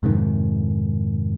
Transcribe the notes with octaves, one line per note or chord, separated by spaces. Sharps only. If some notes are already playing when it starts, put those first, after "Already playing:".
F2 G#2 C3 D#3